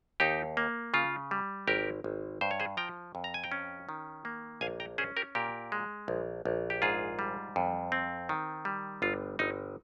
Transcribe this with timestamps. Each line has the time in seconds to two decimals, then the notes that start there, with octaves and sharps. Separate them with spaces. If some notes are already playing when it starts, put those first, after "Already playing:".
0.20 D#2 D#4 G4
0.57 A#3
0.94 C#3 F4
1.31 G3
1.68 G#1 G4 A#4
2.04 G#1
2.41 G2 C5
2.51 C#5
2.60 G#4 C5
2.77 F3 G5 A#5
3.15 F2
3.24 A#5
3.34 G#5
3.44 G5 A#5
3.52 C#4
3.89 D#3
4.25 A#3
4.61 A#1 F5 G#5
4.80 G5 A#5
4.98 C#4 G#4 C5
5.17 G4 A#4
5.35 A#2 G4 A#4
5.72 G#3
6.08 A#1
6.45 A#1
6.70 G4
6.82 G#2 F4 G#4
7.19 G3
7.56 F2
7.92 C4
8.29 D#3
8.65 G3
9.02 G1 F4
9.39 G1 D#4